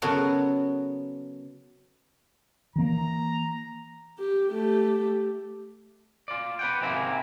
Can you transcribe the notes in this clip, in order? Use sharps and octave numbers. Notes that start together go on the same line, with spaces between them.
C#3 F#3 B3 F#4 A4 A#4
E3 A#3 A#5
G4
A3 G4
F4 D5
B4 F#5 G5
G#2 C3 G#3 A#3 C4 E4